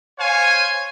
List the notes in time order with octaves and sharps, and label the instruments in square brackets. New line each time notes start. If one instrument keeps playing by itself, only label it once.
[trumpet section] C5 C#5 F5 G#5